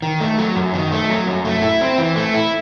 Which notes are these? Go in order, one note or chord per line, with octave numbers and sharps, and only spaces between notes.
D#3
A3
F#3
F#2
D#3
A3
F#3
F#2
A3
E4
C4
E3
A3
E4